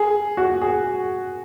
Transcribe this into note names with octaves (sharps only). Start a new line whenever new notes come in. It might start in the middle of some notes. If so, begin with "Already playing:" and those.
Already playing: G#4
F#4
G#4